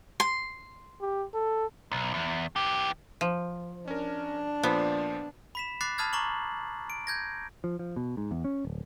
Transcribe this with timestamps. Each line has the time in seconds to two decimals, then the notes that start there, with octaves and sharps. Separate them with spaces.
0.20 C6
1.01 G4
1.34 A4
1.92 B1
2.14 E2
2.56 E3 G4
3.21 F3
3.88 C#4 D4 A#4
4.63 A#2 F3 B3 C5
5.55 B5 B6 E7
5.81 B5 D6 F#6 A6 C7
5.98 A5 B5 D#6 F6 G#6 A6
6.13 A#5 C#6 D6 F#7
6.90 D7
7.07 G6 G#6 A#6
7.64 F3
7.79 F3
7.96 B2
8.17 G#2
8.31 E2
8.44 C#4
8.65 D1